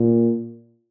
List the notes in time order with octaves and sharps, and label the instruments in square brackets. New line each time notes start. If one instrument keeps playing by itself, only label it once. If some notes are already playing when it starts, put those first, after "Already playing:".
Already playing: [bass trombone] A#2